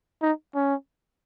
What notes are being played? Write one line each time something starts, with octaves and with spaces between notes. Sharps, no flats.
D#4
C#4